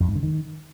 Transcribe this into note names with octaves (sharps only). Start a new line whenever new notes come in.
F2
G#2
D3
D#3